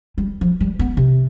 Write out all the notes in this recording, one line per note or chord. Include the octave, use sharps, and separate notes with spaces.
G3
F3
G3
B3
C3